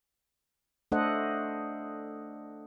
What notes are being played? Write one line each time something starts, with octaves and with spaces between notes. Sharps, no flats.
A3 D4 A4 C5 D#5 F#5